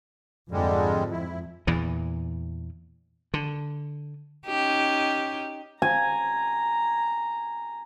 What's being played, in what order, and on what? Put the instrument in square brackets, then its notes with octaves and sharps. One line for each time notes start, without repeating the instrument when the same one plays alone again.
[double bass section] F2 G#2 [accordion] D3 G3 G#3
[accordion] E4
[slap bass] E2 A#2 E3
D3
[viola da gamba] C#4 D#4 G4
[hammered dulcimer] G#5 [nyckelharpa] A#5